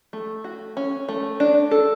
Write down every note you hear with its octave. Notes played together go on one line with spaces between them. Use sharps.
A3
F#4
C#4
A3
D4
A4